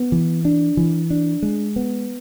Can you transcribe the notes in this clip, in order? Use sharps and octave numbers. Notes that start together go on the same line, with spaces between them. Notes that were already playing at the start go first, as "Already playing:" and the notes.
Already playing: B3
E3
D4
E3
D4
G#3
B3